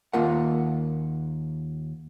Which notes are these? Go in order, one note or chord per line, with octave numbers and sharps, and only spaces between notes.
D#2 A#3 F4 A#4 F#5